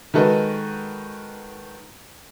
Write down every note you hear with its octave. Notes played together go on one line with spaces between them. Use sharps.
D#3 G#3 F#4 A4 B4 D#5